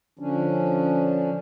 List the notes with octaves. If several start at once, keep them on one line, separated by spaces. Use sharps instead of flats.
D3 F3 C#4 D4